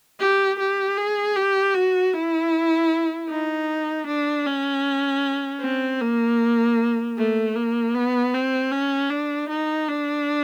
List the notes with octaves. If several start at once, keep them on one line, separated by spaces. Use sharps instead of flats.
G4
G4
G#4
G4
F#4
E4
D#4
D4
C#4
C4
A#3
A3
A#3
B3
C4
C#4
D4
D#4
D4